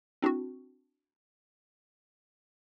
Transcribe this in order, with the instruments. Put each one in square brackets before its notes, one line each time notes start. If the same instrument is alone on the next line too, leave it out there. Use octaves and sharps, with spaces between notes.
[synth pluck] C4 D4 E4 F#4